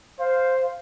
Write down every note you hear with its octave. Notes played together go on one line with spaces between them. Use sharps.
C5 F5